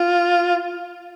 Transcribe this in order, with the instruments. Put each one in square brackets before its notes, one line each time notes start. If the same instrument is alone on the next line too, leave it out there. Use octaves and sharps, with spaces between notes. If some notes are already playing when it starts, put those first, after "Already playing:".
Already playing: [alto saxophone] F4